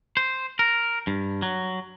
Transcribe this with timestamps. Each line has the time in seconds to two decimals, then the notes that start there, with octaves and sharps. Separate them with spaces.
0.17 C5
0.59 A#4
1.07 G2
1.42 F#3